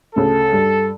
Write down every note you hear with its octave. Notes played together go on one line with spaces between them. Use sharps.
D2 C#3 A4
G2